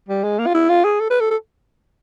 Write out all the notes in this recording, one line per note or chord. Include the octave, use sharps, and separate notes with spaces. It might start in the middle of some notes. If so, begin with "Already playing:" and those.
G3
G#3
A#3
F4
E4
F4
G#4
A4
B4
A4
A4